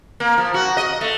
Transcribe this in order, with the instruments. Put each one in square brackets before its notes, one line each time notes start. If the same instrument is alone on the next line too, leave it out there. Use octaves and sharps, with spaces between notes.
[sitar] A#3
F3
F#4
D#5
A3